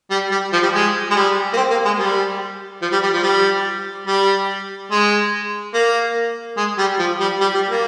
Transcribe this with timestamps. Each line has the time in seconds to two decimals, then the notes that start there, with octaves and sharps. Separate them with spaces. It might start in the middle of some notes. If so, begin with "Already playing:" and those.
0.10 G3
0.31 G3
0.53 F3
0.63 G3
0.74 G#3
1.11 G#3
1.16 G3
1.53 A#3
1.57 C4
1.71 A#3
1.85 G#3
1.98 G3
2.82 F3
2.92 G3
3.03 G3
3.13 F3
3.23 G3
4.07 G3
4.91 G#3
5.74 A#3
6.57 G#3
6.78 G3
6.99 F3
7.20 G3
7.41 G3
7.55 G3
7.69 A#3